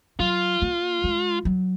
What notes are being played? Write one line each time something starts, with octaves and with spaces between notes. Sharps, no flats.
F#3 F4
A#3
G#3
F#3